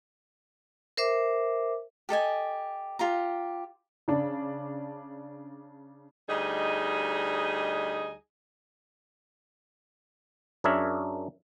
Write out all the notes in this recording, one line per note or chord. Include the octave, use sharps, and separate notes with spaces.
A#4 C5 E5 D6
G4 A4 D#5 G#5
F4 G4 A#5
C#3 D4
D2 G3 D#4 G#4 D#5
F#2 D4 G#4 A#4 C#5 E5